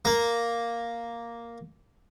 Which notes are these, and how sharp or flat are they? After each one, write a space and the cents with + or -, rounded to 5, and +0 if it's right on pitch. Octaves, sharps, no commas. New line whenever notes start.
A#3 +0 A#5 +0